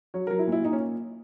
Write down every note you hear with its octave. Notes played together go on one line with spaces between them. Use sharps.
F#3 C#5
F#3 A#4
E4
A#2
E4
A#2 D#4
C#4